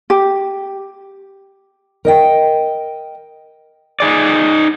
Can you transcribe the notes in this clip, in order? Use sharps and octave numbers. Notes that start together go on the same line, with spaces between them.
G4
A#4 D#5 G5
D#4 G#4 D5